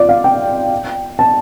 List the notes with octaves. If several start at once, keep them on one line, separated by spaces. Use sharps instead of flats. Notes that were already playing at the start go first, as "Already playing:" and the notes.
Already playing: F4 D5
F5
G5
A5